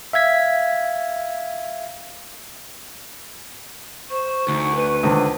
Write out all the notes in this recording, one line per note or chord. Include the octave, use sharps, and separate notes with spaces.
E5 F5 G#6 B6
C5 C#6
D2 D#4
B4
C#2 D3 D#3 C5